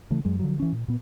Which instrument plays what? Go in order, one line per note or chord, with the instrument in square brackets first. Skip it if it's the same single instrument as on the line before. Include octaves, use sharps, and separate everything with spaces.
[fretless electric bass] C#3 E3 A3
F#2 F#3 G#3
D3 F3 F#3
E3 C#4
A#2
A#2 B3